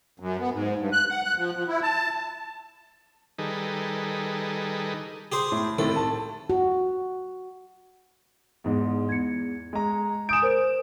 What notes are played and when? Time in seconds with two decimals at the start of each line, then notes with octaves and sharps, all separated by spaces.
0.20 F#2
0.40 B3
0.52 G#2
0.78 G2
0.93 F#6
1.10 F#5
1.24 F#6
1.37 F3
1.57 F3
1.68 E4
1.82 A5
3.38 D#3 G3 D#4 G#4 A4 B4
5.32 G4 G#4 C5
5.52 A2
5.79 C2 A2 D#3 A4
5.96 A5
6.50 F#4
8.64 E2 G#2
9.09 E2 G#6 C#7
9.73 G#3 A#5
10.29 G#5 D#6 G6 D7 E7
10.42 A#4 C5